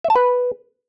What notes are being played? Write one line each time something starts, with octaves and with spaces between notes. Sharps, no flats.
E5
A5
B4